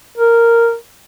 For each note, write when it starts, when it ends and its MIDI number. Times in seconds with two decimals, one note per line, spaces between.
0.18 0.74 70